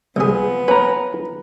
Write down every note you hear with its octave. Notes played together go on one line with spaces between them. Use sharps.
C2 F3 B3 G#4
C#4 B4 A#5